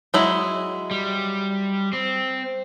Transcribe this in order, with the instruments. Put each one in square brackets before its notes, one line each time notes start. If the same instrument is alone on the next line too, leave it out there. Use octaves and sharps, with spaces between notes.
[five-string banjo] F#3 G#3 E4
[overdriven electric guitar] G3
C4